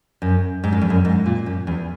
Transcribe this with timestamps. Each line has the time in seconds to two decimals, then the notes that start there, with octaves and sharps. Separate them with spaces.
0.22 F#2
0.64 G#2
0.72 F#2
0.81 E2
0.90 F#2
1.05 G#2
1.26 A#2
1.46 F#2
1.67 E2